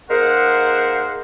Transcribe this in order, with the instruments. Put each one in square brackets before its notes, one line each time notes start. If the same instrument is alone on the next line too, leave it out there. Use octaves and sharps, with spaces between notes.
[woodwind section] A#3 D#4 G#4 A#4 C5 F#5